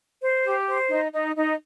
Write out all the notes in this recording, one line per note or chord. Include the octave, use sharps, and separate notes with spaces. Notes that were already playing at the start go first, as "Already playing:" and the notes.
C5
G4
C5
D#4
D#4
D#4